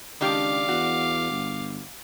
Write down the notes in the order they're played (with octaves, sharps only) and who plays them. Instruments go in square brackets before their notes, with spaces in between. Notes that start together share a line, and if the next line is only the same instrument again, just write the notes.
[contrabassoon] C#2 [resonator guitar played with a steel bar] D#3 D4 G4 [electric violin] F5 D6
[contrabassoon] E2 [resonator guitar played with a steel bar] F#4
[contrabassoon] G1